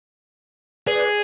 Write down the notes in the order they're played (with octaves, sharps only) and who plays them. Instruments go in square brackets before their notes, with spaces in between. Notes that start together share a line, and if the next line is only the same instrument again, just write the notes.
[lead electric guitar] G#4 [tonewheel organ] B4 D5